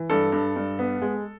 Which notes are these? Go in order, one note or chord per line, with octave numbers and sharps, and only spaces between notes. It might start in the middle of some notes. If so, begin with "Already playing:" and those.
Already playing: E3
G2 A4
G2
G2
B3
G#3